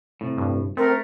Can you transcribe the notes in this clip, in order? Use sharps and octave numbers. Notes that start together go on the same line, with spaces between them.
A2 C3
G2
A3 C4 A#4